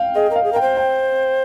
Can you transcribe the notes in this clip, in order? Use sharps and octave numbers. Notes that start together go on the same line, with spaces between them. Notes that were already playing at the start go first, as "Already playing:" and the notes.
Already playing: F5 G5
G#4 D#5
A#4 F5
G#4
A#4 G5
C5
G5